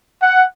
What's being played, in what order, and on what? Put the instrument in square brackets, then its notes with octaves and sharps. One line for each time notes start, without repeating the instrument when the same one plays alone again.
[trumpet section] F#5